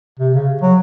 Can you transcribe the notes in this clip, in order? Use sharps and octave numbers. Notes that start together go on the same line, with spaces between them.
C3
C#3
F#3